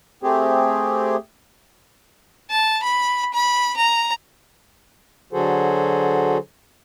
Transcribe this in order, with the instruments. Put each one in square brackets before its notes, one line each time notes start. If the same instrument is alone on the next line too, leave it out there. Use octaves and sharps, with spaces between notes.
[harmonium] A3 C4 G4 G#4
[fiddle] A5
B5
B5
A#5
[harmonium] D3 F#3 F#4 G#4 A4 C5